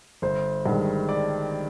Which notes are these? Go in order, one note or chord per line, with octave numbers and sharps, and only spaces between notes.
G1 C5
G2 D#3 G#3
D5